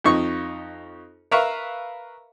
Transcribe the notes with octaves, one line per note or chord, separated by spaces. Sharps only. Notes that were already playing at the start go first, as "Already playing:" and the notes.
F2 D#4 C#6
A#4 B4 E5 F5 C#6